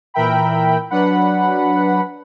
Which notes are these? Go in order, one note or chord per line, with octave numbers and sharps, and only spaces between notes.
A#2 E3 A#4 E5 G5 B5
F#3 D4 B4 F#5 B5